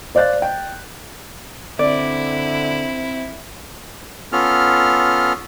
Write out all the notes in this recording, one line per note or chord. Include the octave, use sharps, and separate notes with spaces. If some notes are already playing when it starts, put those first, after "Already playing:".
C5 D5 F5 F#6 A6
G5
D3 C4 E4 D5
B3 C#4 F4 A4 F6